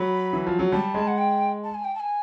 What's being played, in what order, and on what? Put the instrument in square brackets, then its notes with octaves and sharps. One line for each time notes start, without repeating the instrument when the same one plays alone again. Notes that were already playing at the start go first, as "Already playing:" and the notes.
Already playing: [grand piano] F#3 [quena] B5
[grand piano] E3
F3
F#3
[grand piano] G3 [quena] A5
[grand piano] G#3
[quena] F#5
G5
A5
G#5
G5
A5
G#5